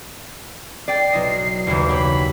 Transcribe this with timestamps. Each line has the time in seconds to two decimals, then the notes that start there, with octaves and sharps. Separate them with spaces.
0.88 D5 G5 C7
1.13 B1 E4 D#5
1.67 F#1 D#2 E3 G3
1.88 B3 G4 C#5 B5